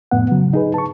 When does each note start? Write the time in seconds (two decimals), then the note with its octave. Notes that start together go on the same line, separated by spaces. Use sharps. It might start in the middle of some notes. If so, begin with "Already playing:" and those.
0.11 F2 A2 B3 F#5
0.31 C#3 F#3
0.53 D#4 G#4 B4
0.74 A5 C#6